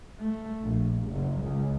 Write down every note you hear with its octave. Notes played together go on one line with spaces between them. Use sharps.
A3
A#1
F#1
C#2